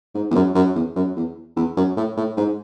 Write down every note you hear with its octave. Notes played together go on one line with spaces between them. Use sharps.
G#2
E2
F#2
F#2
E2
F#2
E2
E2
F#2
A2
A2
G#2